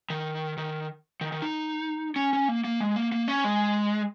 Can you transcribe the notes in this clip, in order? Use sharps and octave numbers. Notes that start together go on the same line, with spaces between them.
D#3
D#3
D#3
D#3
D#4
C#4
C#4
A#3
A#3
G#3
A#3
A#3
C#4
G#3